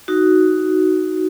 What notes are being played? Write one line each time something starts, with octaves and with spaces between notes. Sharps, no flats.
D#4 F#4